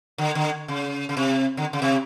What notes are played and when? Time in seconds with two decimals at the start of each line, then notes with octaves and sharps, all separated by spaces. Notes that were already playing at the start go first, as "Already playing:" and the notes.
0.18 D3
0.35 D3
0.68 C#3
1.09 C#3
1.17 C3
1.57 D3
1.73 C#3
1.82 C3